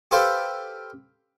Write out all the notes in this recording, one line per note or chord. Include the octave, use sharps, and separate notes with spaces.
G4 A4 B4 C5 F5 G5